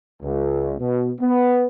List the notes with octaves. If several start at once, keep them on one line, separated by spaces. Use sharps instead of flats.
C#2
B2
B3